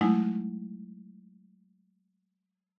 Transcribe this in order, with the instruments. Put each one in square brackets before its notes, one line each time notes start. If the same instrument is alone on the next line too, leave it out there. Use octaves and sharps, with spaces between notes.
[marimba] F#3 G#3 A3 D#4 E4